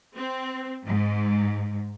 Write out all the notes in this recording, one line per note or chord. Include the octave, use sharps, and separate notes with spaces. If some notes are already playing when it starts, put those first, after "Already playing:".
C4
G#2